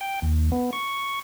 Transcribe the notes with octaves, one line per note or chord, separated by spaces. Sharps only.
G5
D#2
B3
C#6